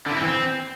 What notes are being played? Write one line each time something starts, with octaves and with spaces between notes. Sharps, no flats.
D3
E4
C4
E3
C4